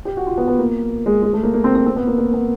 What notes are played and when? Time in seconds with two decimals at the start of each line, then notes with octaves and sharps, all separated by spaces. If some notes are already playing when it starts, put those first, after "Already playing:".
0.05 G4
0.17 F#4
0.27 F4
0.37 B3
0.48 B3
0.59 A#3
1.06 G#3
1.22 G#3
1.33 A3
1.43 A#3
1.54 A#3
1.64 C4
1.75 C4
1.86 C4
1.96 B3
2.07 A#3
2.18 A#3
2.33 B3